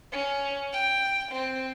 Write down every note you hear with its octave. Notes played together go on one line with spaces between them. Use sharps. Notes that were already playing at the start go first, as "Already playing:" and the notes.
C#4
G5
C4